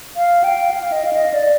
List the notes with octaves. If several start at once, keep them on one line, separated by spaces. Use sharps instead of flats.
F5
G5
F5
D#5
F5
D#5
D5